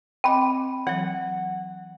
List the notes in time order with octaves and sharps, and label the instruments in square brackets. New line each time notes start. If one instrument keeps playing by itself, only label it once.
[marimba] C4 D#5 D6 [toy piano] G5 B5
[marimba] E3 F#3 [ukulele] F#5